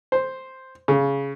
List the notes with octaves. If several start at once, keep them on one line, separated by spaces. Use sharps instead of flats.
C5
C#3